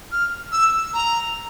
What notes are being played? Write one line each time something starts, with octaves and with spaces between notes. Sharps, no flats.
F6
E6
A#5